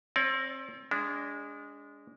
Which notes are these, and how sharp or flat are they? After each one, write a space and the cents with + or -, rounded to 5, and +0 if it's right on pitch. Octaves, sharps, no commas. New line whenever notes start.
C4 +30 D5 -35
G#3 -15 D4 -35